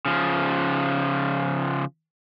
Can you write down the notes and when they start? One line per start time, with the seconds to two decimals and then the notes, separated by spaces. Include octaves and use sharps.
0.05 C#3 F3